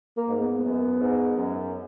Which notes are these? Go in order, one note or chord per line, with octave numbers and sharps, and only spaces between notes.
A#3
G#2
B3
F#2
G#2
F#2